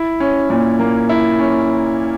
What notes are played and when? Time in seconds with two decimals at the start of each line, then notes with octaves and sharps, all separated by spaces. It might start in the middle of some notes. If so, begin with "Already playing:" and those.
Already playing: E4
0.20 C#4
0.50 A#2
0.79 A#3
1.09 E4
1.39 C#4